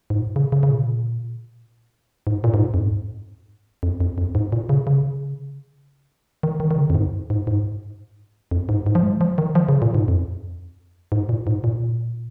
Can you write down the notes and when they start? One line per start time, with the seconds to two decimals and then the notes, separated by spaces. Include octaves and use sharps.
0.10 G#2
0.19 A#2
0.36 C#3
0.52 C#3
0.63 C#3
0.70 A#2
2.27 G#2
2.44 A#2
2.54 G#2
2.61 A#2
2.74 F2
2.78 G#2
3.83 F2
4.00 F2
4.18 F2
4.35 G#2
4.52 A#2
4.69 C#3
4.87 C#3
6.43 D#3
6.60 D#3
6.71 D#3
6.78 C#3
6.90 F2
6.95 G#2
7.30 G#2
7.47 G#2
8.51 F2
8.69 G#2
8.86 G#2
8.95 F3
9.03 G#3
9.21 F3
9.38 D#3
9.55 F3
9.69 C#3
9.82 A#2
9.95 G#2
10.08 F2
11.12 G#2
11.29 A#2
11.47 G#2
11.64 A#2